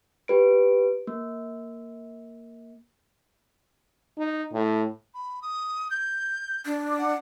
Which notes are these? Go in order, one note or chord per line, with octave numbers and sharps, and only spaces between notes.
G4 B4 D7
A#3
D#4
A2
B5
D#6
G6
D4
F#5